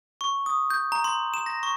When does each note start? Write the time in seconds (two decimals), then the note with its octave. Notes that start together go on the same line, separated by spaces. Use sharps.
0.21 C#6
0.46 D#6
0.70 G6
0.92 A#5
1.04 C6
1.34 E7
1.46 A#6
1.63 C#6